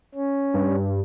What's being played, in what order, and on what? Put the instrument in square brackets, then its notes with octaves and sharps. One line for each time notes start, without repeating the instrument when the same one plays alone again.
[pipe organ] C#4
[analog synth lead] G2